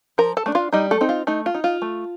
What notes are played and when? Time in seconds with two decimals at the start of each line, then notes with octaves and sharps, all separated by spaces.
0.18 F3 A#4 A#5
0.37 A4 A5
0.46 A3 D4
0.55 F4 F5
0.73 G3 D#4 D#5
0.91 A3 A4
1.01 C4 D#4
1.09 F4
1.27 A3 D#4
1.46 F4
1.54 D#4
1.64 F4
1.82 A3